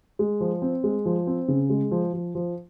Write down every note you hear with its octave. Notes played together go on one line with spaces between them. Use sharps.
G#3
F3
C4
G#3
F3
C4
C#3
G#3
F3
F3
F3